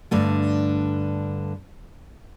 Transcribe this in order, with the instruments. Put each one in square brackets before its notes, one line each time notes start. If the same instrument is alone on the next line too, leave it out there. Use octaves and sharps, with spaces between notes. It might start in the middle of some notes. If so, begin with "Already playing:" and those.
[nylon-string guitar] G2 D3 A3